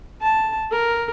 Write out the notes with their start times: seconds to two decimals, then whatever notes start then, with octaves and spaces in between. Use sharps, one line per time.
0.21 A5
0.71 A#4